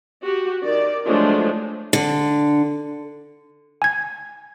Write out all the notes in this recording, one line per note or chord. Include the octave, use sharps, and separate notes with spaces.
F#4 G4
D#3 D5
F3 F#3 G#3 A3 D4 F4
D3
G#5 G#6